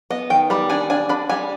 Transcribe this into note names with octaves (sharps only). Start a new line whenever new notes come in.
B3 D#5
D#3 G5
G3 B5
D4 G#5
D4 G#5
D4 B5
G3 G#5